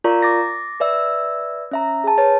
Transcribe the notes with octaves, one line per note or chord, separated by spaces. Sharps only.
F4 A#4 D5 A#5 C#6
D6 A6 A#6
B4 D5 E5 E6
C#4 E5 A#5
G#4 A5
B4 C#5 A6